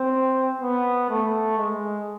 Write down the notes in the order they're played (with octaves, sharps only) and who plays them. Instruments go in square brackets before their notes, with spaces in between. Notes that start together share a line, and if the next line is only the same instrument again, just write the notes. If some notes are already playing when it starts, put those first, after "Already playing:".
Already playing: [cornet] C4
B3
A3
G#3